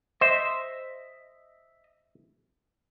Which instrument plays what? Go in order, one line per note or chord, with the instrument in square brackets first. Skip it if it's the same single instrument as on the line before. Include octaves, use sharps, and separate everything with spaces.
[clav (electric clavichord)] C5 [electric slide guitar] D#5 E5